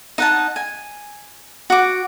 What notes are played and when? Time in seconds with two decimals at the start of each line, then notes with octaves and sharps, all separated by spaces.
0.18 D#4 F#5 A5
0.56 G#5
1.70 F#4 D6